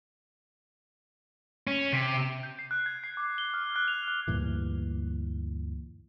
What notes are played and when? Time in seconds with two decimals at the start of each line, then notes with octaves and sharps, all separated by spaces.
1.67 C#4
1.93 C3
2.43 G6
2.59 C7
2.71 F#6
2.86 G#6
3.04 C7
3.17 D6
3.38 G7
3.54 F6
3.76 F#6
3.88 F7
4.08 F#6
4.28 D2 G2 A#2 E3